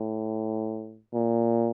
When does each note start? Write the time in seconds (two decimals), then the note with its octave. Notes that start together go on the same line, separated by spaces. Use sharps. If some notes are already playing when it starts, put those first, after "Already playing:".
Already playing: A2
1.14 A#2